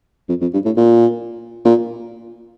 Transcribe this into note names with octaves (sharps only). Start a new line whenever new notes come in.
F2
F2
G2
A2
A#2
A#2